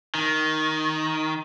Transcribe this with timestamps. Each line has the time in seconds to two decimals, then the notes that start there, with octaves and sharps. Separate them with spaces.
0.15 D#3